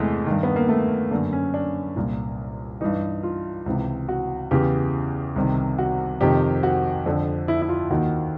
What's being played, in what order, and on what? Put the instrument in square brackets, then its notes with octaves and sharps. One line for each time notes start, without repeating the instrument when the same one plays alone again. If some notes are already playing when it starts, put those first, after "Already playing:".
Already playing: [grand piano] E2 C3 E3 G#3 A3
G2 D#3
B3
A#3
A3
D3 A#3
F#2
C#4
D4
C2 A#2
G2 E3 D#4
F4
C#2 C3 E3
F#4
E2 C#3 E3 G4
C2 C3 D#3
F#4
F2 C3 D#3 G4
F#4
F2 D3
E4
E4
F4
D#2 D#3 F#4